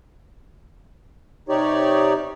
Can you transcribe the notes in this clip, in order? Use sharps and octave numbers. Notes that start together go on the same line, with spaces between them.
C3 D#4 G4 C#5 D5